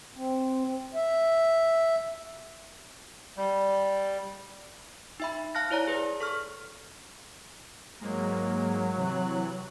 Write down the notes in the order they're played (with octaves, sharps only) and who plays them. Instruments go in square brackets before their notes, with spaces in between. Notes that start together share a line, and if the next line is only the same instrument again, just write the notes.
[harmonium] C4
E5
[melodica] G3
[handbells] D#4 E5 B5
F5 A5 F6 F#6 A#6
E4 C#5 D5 A#5
G#4 B4
A4 C#6 F6
[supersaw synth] G#2 G#3 A#3 [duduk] F#3
[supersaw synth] C3 E3 F#6